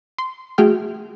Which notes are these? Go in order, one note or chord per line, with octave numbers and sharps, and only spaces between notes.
C6
A3 F#4 G#4 G5 F6